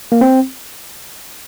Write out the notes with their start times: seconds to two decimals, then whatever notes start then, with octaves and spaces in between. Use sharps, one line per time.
0.12 A#3
0.21 C4